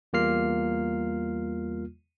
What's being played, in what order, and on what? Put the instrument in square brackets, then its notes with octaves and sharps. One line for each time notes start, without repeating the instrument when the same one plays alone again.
[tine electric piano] E2 G3 A#3 F4 F6 C7